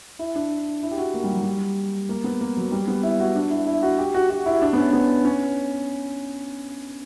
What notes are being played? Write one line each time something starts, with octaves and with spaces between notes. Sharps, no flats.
E4
D4
E4
G4
F#4
A#3
G3
F#3
G3
A#3
B3
A#3
F#3
G3
B3
E4
F#4
D4
E4
E4
F#4
G4
F#4
F#4
E4
D4
B3
C#4
B3
C#4